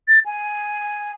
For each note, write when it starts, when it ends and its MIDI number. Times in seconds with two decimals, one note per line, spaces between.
0.08 0.19 93
0.26 1.12 80